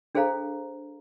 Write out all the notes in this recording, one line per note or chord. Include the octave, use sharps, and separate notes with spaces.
D4 G#4 A4 C5 F5 A#5